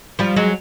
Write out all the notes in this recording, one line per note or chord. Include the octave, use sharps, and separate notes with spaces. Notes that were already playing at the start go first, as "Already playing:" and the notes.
F3 G3
F#3 G#3